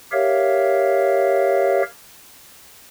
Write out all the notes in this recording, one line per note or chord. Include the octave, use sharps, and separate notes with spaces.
G4 A#4 C#5 E5 F5